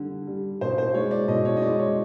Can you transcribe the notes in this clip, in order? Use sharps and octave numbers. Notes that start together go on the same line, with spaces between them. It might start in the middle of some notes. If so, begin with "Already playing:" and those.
Already playing: D3 G3
G3
B2 C5
C5
G#3 C#5
D5
B2 D#5
C#5
D#5
G#3 D5
C#5